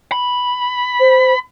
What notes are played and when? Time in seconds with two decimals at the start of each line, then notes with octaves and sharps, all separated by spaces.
0.12 B5
1.00 C5